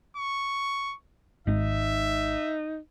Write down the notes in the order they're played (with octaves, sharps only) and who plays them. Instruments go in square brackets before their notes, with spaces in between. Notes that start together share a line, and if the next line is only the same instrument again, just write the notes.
[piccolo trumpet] C#6
[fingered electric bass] G#1 G#2 [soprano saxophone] D#4 [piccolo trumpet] E5